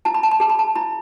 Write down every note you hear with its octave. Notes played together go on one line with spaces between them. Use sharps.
E4 A5
B5
A5
B5
G#4 A5
B5
A5
E4 B5